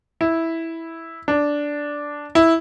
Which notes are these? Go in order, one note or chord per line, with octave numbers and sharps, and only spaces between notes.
E4
D4
E4